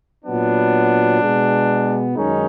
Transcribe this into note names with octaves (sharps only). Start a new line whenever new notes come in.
A#2 F#3 B3 D4
B2 G#3 B3
F#2 D#3 G#3 C#4 D#4